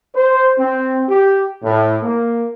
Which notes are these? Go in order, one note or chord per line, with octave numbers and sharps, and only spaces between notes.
C5
C4
G4
A2
A#3